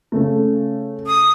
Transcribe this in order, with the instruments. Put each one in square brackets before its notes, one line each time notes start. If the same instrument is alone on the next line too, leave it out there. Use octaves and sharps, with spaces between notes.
[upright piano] C#3 A3
[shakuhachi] D#6